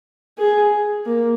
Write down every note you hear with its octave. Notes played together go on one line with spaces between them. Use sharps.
G#4
A#3